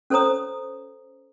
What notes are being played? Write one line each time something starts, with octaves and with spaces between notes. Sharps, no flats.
C#4 A4 C5 C#5 A#5 D#6